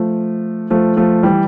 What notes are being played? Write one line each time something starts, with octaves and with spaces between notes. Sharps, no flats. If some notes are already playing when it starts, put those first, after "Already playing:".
Already playing: F3 A3
F3 A3
F3 A3
E3 G3